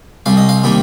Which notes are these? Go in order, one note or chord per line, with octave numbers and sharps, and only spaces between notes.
C2 C3 G3 F5
D#5
F5
C3 D#3 G3 A#3 D#4